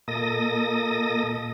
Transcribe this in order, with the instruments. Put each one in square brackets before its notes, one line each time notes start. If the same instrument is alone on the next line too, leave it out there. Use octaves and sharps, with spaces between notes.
[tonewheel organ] A#2 A#3 A4 D#5 D#6 A#6